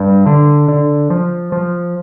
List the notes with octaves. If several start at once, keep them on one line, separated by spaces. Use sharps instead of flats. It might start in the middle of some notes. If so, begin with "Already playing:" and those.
Already playing: G2
D3
D3
F3
F3